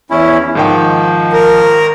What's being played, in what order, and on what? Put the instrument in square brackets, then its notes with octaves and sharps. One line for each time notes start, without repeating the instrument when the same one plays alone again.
[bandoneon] E2 C#4 E4
[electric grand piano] G#2 D#3 G5 [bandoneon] F3
[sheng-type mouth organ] A#4